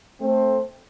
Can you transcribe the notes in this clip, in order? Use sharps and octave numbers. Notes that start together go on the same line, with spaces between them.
A3 C4